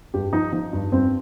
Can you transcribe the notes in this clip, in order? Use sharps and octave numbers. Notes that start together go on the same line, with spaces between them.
G2 G4
F3 D#4
F3 D#4
G2
G2 C4